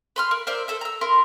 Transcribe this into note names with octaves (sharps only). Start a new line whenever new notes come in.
B4 C6 F6
A#4
A#4 C5 D5 E5
A4 C5 E5
A#5 E6
E4 A#4 C6